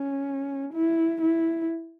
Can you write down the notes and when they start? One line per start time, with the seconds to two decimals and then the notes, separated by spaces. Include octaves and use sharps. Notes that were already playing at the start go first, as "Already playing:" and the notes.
Already playing: C#4
0.74 E4
1.22 E4